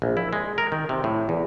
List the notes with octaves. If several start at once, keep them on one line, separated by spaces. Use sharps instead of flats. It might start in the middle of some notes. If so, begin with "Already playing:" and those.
A#1
E4
G#3
A#4
D#3
C3
A2
E2